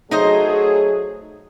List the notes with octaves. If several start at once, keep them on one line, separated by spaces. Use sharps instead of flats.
F#3 A3 D#4 G#4 C5 D#5